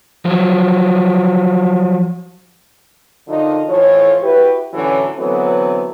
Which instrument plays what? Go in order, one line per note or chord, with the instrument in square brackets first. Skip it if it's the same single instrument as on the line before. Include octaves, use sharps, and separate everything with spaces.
[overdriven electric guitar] F3 F#3
[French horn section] D3 D#3 F3 D#4 F4 D#5
F2 A2 E3 F3 C#5
E4 F#4 G4 B4
A2 D3 E3 F#3 C#4
D3 E3 F#3 A3 B3 C4